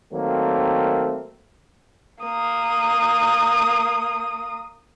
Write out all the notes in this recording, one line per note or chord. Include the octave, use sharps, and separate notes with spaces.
D#3 F#3 A3 A#3 C4
A#3 D#6